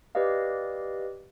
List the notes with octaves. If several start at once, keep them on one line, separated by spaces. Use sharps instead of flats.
G4 B4 D5 D#5 F5